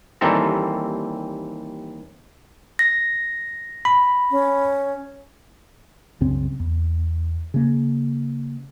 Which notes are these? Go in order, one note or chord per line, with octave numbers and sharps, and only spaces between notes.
D#2 E3 G3 C4 A4 A#5
A#6
B5
C#4
C2 F#2 C#3 C4
E2
C#3 A#3